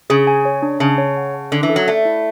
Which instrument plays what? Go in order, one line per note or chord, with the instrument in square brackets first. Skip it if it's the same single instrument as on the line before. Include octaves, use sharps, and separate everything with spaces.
[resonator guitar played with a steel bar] C#3 [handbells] G#4
[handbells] G#5
C#5
D4
[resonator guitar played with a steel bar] C#3 [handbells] A5
[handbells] C#5
F#5
A5
[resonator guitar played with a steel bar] D3 [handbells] C#4
[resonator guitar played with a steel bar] E3
[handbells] A4
[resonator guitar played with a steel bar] F#3
[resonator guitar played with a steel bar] A3 [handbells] D5
[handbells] E4